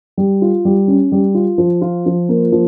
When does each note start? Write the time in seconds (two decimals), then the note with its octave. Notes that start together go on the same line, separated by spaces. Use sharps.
0.18 G3
0.42 F4
0.65 G3
0.88 C#4
1.12 G3
1.35 F4
1.58 F3
1.82 F4
2.06 F3
2.29 A#3
2.52 F3